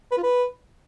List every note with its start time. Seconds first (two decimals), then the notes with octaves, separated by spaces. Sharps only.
0.11 B4
0.17 F4
0.23 B4